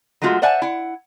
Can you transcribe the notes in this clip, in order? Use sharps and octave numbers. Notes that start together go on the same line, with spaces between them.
F#3 G#3 A3 F4 F#4
C5 D5 E5 F#5 G#5 A5
E4 F#5